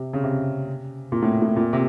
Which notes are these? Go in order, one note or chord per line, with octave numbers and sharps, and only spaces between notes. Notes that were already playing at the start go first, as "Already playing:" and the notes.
Already playing: C3
C#3
C3
A#2
A2
A2
A#2
C3